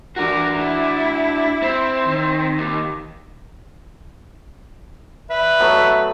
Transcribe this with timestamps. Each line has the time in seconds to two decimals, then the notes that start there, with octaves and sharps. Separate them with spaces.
0.16 E3 D4 F#4 A#4
0.58 E4
1.62 C4
2.05 D#3
2.58 D#2
5.30 B4 E5
5.60 F#3 A3 B3